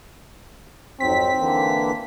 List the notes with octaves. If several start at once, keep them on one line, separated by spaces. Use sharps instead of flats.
F2 G#2 F#3 C4 B6
D3 E3 A#3